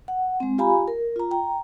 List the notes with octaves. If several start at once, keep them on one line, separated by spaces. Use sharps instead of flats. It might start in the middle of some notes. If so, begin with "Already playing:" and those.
F#5
G#3 C4
F4 G4 F5 G#5 A#5 B5
A#4
F4 A#5
G5 A#5